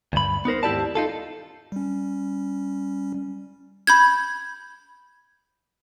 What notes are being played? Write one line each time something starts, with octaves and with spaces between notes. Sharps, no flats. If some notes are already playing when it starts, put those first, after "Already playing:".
D2 G2 B5
B3 D#4 A#4 C5
D#2 G#2 E4 G4 D5 A5
D#4 F4 A4
G3 C#4
B5 G6 G#6